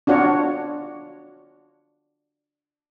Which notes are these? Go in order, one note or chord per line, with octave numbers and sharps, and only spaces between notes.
D4 F4 F#4 C#5